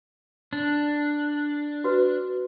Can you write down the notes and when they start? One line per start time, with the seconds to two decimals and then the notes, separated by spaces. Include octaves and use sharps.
0.53 D4
1.84 F#4 B4